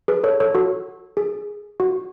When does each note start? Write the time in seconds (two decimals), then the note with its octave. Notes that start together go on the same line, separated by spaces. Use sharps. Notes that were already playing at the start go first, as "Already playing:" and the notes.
0.08 G#4 B4
0.24 A4 C#5
0.40 A4 C#5
0.55 F#4 A4
1.17 G#4
1.80 F#4